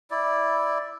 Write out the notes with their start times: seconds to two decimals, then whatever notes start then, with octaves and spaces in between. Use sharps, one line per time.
0.11 E4 D5